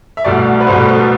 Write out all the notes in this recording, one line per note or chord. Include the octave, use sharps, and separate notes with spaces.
E5
C2 B2 A3 D5
B4
C2 B2 A3 C5
B4
A4
A4